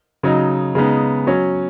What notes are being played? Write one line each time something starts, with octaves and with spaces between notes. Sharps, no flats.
C#3 F#3 D#4
C#3 G#3 B3 D#4
F#3 C#4